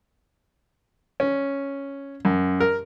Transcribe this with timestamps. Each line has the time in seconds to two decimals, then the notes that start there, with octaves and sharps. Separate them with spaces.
1.20 C#4
2.25 F#2
2.60 A#4